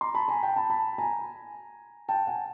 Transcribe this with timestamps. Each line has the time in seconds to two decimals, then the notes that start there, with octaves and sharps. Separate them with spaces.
0.01 A#5 C6
0.15 A5 B5
0.28 G#5 A#5
0.43 G5 A5
0.56 A5 B5
0.70 A5 B5
0.98 G#5 A#5
2.09 G5 A5
2.27 F#5 G#5